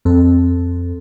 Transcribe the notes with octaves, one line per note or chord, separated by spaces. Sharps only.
F2 C4 A4